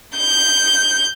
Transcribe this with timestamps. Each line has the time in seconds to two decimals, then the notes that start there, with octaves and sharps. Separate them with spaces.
0.16 G6